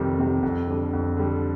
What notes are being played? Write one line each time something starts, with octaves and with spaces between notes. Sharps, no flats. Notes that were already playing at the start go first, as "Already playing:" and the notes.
Already playing: F2 C3 D#3 G3
C3 D#3 G3
F2
D3 G3
F2
D3 G3